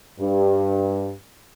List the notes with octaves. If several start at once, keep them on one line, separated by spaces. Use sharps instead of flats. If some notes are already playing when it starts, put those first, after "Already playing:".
G2